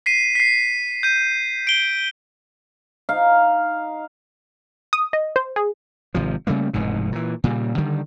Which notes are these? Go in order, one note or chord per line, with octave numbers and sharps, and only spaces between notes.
B6 C7 D#7
B6 C7
G6 D#7
D7 G7
D#4 F5
D#6
D#5
C5
G#4
G#1 C3 F3
C#3 G3 A3 A#3
F1 E2 G#2 B2
A#2 E3
A#2 C#3 G3
D3 D#3 G3